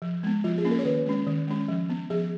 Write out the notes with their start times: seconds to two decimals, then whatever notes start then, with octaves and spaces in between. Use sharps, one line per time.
0.02 F3
0.23 G#3 B3
0.44 F3 F4
0.58 G#4
0.65 A#3 C#4
0.71 A#4
0.79 C#5
0.85 D#3 B4
1.06 G#3 C#4
1.27 D#3
1.48 G#3 C#4
1.68 F3
1.90 B3
2.10 F3 G#4